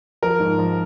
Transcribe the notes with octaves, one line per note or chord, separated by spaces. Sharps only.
F3 A#4
G#2
F3